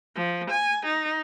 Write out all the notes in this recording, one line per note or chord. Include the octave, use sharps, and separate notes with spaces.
F3
G#5
D#4